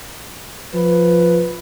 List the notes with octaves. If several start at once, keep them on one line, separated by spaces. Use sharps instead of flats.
F3 B4